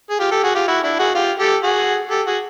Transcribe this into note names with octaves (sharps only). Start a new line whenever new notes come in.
G#4
F4 G4
G4 A4
F#4 G#4
F4 G4
E4 F#4
D4 E4
F#4 G#4
F4 G4
G4 A4
F#4 G#4
G4 A4
F#4 G#4